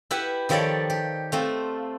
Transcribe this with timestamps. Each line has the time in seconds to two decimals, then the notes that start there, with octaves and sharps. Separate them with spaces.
0.11 E4 G4 B4 E5 F#5
0.49 D#3 F3 G4 A4 C#5 D5
0.90 G4
1.32 A3 C4 F4